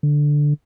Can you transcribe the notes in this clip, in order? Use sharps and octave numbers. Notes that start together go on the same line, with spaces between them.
D3